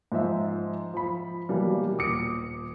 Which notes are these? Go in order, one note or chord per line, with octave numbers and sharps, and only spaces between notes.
G#2 F3 C5 E5
F3 B5
B2 E3 F#3 G3 A#3
D#1 D6 D#6 C#7 D7